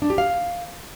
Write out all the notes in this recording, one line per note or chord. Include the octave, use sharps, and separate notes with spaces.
D4
G4
F5